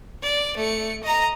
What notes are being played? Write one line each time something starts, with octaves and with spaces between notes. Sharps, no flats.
D5
A3 C#7
D#5 A#5